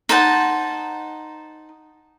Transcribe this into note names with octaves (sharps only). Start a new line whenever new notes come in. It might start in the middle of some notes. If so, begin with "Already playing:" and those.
D#4 C5 F#5 A5